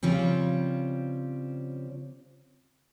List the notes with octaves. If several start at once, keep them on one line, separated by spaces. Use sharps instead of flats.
C#3 F3 G3 C4